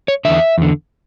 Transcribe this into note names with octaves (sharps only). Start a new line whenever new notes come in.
C#5
E2 D3 E5
E2 D3